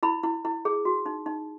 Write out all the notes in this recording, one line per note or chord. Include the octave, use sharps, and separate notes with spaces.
E4 B5
E4
E4
G#4
F#4
D#4
D#4